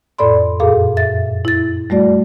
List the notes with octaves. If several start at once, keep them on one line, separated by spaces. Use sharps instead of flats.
F2 A2 A4 D5 B5 C6
F#2 A#2 G#4 A4 F5
E5 A6
E4 A6
G3 A3 F#4 D5